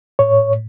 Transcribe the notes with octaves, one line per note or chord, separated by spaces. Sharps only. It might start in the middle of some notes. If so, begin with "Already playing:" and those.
A2 C#5